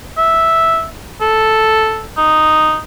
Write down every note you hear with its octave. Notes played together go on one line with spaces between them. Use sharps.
E5
A4
D#4